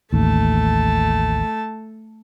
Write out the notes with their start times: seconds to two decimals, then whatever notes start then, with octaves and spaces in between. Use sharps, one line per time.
0.13 A1 D#2 A3 A5